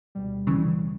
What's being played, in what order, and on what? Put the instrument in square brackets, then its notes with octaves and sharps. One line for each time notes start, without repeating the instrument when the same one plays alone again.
[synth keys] D2 B2 G3
[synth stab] C#3 E3